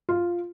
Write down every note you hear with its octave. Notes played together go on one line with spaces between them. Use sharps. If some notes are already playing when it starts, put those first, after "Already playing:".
F4